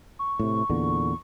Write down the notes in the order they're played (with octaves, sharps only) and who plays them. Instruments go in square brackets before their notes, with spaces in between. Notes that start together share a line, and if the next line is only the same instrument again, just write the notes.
[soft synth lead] C#6
[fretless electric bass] A2 C3
E2 A#2 D3